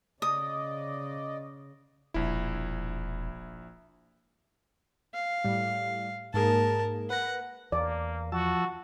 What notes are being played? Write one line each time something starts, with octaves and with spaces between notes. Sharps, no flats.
C#3 D5 D#5 D#6
E1 A#1 E4
F5
A2 G3
G#2 A#3 G#4 A#4 A5
B4 F#5 A#6
E2 A#3 D5
F3 F#4 A5 E6